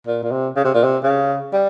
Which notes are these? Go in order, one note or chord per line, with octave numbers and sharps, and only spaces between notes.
A#2
A#2
C3
C#3
C3
A#2
C3
C#3
G3